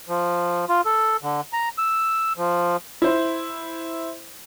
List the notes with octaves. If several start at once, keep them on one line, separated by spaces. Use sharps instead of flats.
F3
F4
A4
D3
A#5
E6
F3
E4 C5